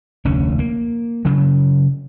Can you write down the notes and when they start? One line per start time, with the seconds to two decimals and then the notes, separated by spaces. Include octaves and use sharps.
0.25 F1 D2 C#4
0.59 A#3
1.25 C#3 F#3